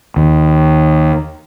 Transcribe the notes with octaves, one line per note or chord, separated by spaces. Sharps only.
D#2